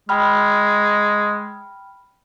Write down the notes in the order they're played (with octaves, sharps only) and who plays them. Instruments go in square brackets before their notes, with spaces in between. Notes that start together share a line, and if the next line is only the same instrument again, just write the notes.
[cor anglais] G#3 [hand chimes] G5 B5 F6